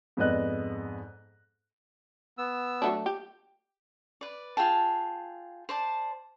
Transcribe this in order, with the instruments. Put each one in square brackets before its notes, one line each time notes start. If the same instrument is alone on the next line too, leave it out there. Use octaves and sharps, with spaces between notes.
[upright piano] F2 G#2 B3 D5 D#5 F#6
[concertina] B3 E6
[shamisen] F#3 A3 D4
G4
[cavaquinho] B4 D5
F4 G#4 G5 A5
C5 D5 A5